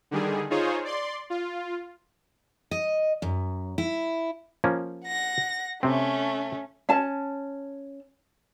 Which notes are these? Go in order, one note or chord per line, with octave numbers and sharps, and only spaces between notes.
D3 D#3 G3 G#4
D#4 F4 G#4 C5 C#5
D5 C6
F4
D#5
F#2
E4
F3 A#3 C#4
F#5 A#6
C3 A3 C4 C#4
C#4 A5